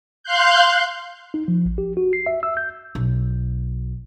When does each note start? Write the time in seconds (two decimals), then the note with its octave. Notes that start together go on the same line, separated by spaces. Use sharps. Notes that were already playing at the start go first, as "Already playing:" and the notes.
0.24 F5 C6 F#6 G6
1.34 D#4
1.48 F3
1.65 A1
1.78 G4
1.97 F#4
2.13 C7
2.26 E5
2.43 E6
2.57 G6
2.95 B1